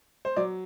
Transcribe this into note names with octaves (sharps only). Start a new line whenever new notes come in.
C5
F#3 D5